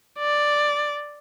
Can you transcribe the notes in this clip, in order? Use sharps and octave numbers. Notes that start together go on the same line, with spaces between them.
D5